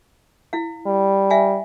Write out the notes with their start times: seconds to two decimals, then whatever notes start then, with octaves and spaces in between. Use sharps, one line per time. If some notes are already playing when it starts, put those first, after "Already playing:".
0.53 E4 F5
0.87 G3
1.30 E5 F5 G#5